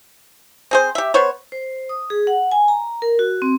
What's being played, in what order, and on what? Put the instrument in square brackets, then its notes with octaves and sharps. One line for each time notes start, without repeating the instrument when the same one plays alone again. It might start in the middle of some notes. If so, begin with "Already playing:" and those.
[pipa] C4 G#4 C5
G4 E5
B3 C5 C#5
[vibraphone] C5
D#6
G#4
F#5
G#5
A#5
A#4
F#4
C4